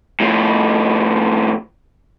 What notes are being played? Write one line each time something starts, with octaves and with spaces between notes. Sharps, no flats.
A2 F3